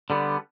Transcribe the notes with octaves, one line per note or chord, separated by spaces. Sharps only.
D3 G3 B3